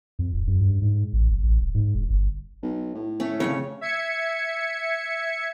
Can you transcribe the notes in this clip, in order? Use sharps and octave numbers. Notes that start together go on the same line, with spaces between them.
F2
D1
F#2
G2
G#2
A1
F#1
A1
D1
G#2
E1
G1
B1
A2
A3 C#4
F2 G#2 C#3 C#5
E5 G#6 C#7